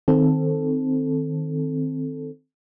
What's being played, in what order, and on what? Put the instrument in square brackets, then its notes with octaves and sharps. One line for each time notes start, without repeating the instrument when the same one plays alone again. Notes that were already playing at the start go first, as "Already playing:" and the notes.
[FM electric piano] D#3 C4 A4